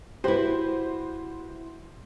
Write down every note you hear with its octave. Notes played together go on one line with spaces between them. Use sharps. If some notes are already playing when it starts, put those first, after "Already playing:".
E4 F#4 G4 B4 C5